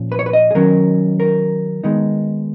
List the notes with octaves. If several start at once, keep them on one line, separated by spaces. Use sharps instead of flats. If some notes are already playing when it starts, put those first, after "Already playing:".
Already playing: A#2 F3 C#4
B4
C#5
B4
D#5
G#4
D#3 F#3 C#4 A#4
A#4
D#3 G#3 B3 D#4